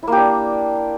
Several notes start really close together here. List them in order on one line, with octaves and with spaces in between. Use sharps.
E4 A#3 G4 D4